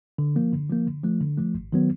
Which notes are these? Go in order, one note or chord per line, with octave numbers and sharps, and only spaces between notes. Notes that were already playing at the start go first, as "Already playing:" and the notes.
D3
F3 A#3
D3
F3 A#3
D3
F3 A3
D3
F3 A3
G#1
D#3 F#3 B3